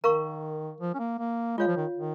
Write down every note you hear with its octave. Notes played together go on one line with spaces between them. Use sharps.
D#3 A#4 F5 A#5 C#6
F3
C#4
A#3
A#3
G#3 F4 C#5 F5
F3
D#3
D#3